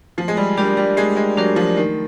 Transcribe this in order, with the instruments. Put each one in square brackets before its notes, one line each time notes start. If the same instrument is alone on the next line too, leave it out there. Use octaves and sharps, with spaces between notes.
[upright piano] F3 [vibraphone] A3
[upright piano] G#3
G3
[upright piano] G3 [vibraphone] D4 G4 A#4 D5
[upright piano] G3
[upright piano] G#3 [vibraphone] A3
[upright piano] G#3
[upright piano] F#3 [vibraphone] D4 G4 A#4 D5
[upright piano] F3
[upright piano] D#3 [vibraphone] A3